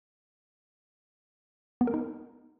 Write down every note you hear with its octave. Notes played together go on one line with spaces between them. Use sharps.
B3
A#4
D#4